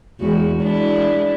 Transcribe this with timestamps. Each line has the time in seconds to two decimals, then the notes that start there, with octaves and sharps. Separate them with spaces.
0.20 E2 G#3 F#4
0.61 G#3 D4 E4